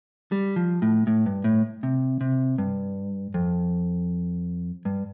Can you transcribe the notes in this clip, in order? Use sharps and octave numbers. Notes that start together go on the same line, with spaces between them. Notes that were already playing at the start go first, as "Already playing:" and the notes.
G3
F3
A2
A2
G2
A2
C3
C3
G2
F2
G2